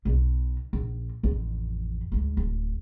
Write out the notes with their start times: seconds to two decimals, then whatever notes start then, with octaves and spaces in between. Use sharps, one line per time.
0.05 B1 B2
0.73 A#1
1.23 A1 F2
2.12 D2 G#2
2.37 D1